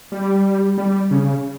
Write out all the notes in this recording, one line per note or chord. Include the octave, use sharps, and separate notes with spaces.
G3
G3
C#3